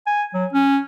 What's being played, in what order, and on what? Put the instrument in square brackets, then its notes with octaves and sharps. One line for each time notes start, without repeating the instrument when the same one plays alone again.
[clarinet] G#5
F#3
C#4